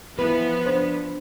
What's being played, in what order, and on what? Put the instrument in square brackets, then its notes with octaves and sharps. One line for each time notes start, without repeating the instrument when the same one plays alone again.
[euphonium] E3 [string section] F3 B3 [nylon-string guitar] B4
[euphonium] D4 [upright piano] C5